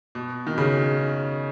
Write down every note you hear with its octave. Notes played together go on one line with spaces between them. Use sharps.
B2
D#3
C#3